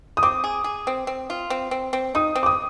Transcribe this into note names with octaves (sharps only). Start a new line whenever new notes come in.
D#6
C4 D6
G#4
G#4
C4
C4
F4
C4
C4
C4
D#4 D#6
C4
D6
D#6